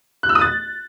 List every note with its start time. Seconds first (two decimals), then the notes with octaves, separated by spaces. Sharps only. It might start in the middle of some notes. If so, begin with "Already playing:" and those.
0.23 F#6
0.29 E6
0.35 D#6
0.41 A6